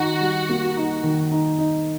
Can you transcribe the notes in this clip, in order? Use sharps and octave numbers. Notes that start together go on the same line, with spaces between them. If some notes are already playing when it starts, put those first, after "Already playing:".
Already playing: D#3 D#4 F#4
G3
A#3
D#4
D#3
D#4
D#4